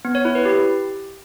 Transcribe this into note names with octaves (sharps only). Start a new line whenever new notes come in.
B3
C#5
E4
B4
G4